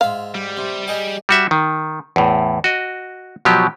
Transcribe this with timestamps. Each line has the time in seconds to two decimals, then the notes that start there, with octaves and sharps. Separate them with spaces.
0.01 G#2 F4 E5 F5
0.35 G3
0.57 C3
0.87 G4 G#4 D#5
1.29 G3 F#4 E5
1.51 D#3
2.16 E2 A2
2.64 F#4 D#5
3.45 B2 F3 F#3 G4